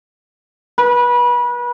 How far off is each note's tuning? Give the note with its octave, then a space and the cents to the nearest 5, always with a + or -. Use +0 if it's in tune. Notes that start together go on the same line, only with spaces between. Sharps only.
B4 -30